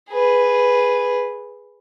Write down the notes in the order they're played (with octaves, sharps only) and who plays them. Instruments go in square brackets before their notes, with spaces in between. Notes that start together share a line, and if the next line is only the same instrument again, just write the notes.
[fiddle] G#4 B4